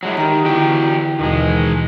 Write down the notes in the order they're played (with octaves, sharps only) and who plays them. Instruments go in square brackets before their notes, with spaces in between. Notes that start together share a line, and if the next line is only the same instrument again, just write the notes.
[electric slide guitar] F#3 G#3 E4
[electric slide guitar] D#3 [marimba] G4 A#5
[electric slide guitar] E2 F#4 G5 [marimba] D3 E4
[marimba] D#2 B2 E3 [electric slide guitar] D#3 G#3